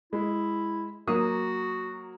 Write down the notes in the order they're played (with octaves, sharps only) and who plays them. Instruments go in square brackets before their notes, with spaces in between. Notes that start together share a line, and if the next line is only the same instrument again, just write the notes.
[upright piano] G#3 [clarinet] E4
[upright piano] F#3 A#3 D#6 [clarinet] F#4